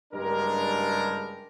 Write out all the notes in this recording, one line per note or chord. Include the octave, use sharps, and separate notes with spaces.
F#1 G2 G3 G#3 D4 A#4